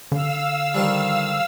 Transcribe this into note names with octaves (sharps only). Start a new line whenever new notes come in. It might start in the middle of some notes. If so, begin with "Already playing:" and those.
D3 F5 E6
D#3 F3 G3